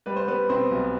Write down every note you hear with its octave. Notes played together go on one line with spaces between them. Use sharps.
G3 B4
C5
G3 B3 B4
B2 C4 C5
B1